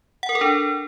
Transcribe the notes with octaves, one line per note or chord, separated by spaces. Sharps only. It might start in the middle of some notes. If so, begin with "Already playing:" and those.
F#5
A#4
A4
D4